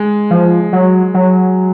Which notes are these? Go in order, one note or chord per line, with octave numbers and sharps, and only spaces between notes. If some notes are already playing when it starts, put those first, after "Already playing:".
Already playing: G#3
F3
F#3
F#3